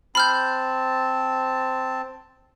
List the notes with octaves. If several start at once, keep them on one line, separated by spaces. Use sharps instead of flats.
C4 A5 B5 F6 G6